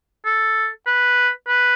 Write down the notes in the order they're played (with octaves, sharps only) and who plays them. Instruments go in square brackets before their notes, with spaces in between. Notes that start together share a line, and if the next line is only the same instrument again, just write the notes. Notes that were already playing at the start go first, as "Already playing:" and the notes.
[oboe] A4
B4
B4